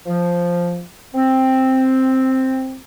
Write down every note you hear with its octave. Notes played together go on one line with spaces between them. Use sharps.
F3
C4